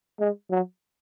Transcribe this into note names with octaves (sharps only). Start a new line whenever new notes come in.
G#3
F#3